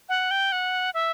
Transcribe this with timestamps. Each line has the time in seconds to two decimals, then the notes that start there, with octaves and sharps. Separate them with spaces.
0.09 F#5
0.31 G5
0.52 F#5
0.94 E5